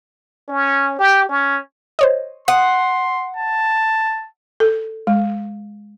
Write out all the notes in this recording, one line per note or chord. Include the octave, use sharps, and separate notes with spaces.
C#4
G4
C#4
C5 C#5 D#5
F#5 C6 D#6
A5
A4
G#3